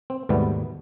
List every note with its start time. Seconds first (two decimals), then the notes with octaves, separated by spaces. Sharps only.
0.10 C4
0.29 D#2 G#2 B2 G3 A3 B3